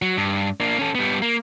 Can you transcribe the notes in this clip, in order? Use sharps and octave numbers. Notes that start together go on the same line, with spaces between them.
F#3
G2
A#3 D4
C#4 A4
G3 B3
A#3